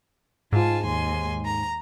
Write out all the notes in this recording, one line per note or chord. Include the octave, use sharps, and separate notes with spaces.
G#2 F4 G#5 A5
D#2 G#5 C6
A#5